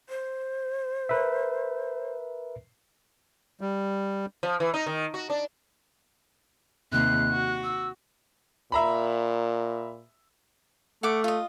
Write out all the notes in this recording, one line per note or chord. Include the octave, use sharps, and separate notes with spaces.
C5
A#4 B4 E5
G3
F3
E3
D#4
D#3
F#4
D4
D#2 C3 F#6
F#4
E6
A#2 E5 A#5 B5
A3 F#5 D6
F4 D#5